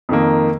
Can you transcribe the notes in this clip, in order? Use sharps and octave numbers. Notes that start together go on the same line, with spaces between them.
F2 D#3 A#3